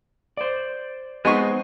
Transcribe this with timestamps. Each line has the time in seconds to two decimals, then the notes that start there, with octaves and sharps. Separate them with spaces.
0.37 C5 D5
1.25 G#3 B3 C4 D#4 B4 C#6